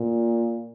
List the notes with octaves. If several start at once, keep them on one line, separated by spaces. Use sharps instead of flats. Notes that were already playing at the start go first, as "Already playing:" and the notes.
Already playing: A#2